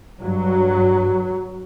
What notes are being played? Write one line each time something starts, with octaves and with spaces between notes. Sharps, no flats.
G2 F#3